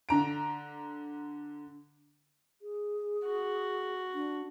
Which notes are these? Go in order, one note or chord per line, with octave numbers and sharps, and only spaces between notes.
D3 A#5 D7
G#4
F#4
D4